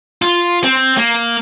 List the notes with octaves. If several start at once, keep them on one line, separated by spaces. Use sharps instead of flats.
F4
C4
A#3